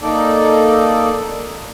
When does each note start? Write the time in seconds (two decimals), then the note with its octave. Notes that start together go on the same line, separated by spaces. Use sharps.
0.02 A#3 D#4 A4 D5